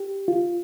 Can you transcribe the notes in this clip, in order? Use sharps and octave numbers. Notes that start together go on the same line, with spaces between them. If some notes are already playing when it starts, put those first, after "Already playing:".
Already playing: G4
F4